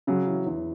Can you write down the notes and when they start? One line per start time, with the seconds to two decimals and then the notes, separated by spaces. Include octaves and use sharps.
0.07 C#3 F#3 C#4
0.27 E3
0.46 E2